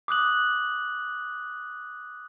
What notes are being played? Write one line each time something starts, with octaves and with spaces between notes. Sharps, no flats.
D6 D#6 F#6 F#7